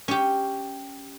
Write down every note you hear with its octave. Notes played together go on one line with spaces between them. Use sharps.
C#4 G4